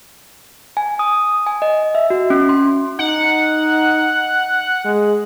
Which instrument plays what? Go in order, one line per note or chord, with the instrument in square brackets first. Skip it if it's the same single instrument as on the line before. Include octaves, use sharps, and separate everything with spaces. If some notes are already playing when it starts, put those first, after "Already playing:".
[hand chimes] G#5
D#6
G#5
D#5
E5
F#4
C#4
C6
[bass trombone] D#4 [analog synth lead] F#5
[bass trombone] G#3